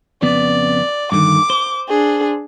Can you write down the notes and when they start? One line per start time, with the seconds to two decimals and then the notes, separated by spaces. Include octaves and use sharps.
0.22 F2 C#3 B3 D5
1.12 G2 D3 D#3 D6
1.50 C5
1.89 D4 G#4